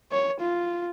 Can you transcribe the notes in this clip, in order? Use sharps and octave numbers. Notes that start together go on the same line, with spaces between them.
C#5
F4